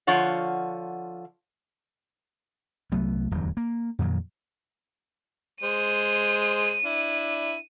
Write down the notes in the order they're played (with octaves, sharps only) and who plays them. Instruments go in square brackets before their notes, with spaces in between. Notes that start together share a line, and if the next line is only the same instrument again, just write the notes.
[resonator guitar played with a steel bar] D3 F3 F4 C#5 F#5
[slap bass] C2 F#3 A3 B3
D1 E2 G2 F#3
A#3
F2 A#2 D#3 F#3
[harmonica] G#3 C5 [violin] D#7
[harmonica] D4 E4